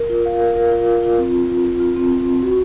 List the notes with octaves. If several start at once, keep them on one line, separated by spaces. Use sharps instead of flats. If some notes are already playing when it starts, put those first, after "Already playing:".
Already playing: A#4
F4
F5
A#4
A#4
F4
F4
F4
C4
F4
F4
F4
F4
C4
F4
C4
F#4